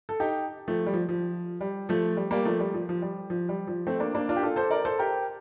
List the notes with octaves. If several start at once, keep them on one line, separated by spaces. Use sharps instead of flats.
A4
D#4 G4
F3 A3
G3
F3
F3
G3
F3 A3
G3
G3 A#3
F3 A3
G3
F3
F3
G3
F3
G3
F3
A3 C4
A#3 D4
A#3 D4
D4 F4
G4
F4 A4
A4 C5
A#4 D5
A4 C5
G4 A#4